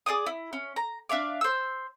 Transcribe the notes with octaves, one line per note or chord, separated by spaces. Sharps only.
G#4 D5 D6 D#6
E4
C#4
A#5
D4 E5 F5 D6
C5 E6